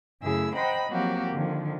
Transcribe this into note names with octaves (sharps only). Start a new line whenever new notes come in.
F#2 C#3 A3 E4 G#4 E6
C5 D#5 F#5 G5 A#5 B5
F3 F#3 A#3 C4 F#4 G4
D3 D#3 F3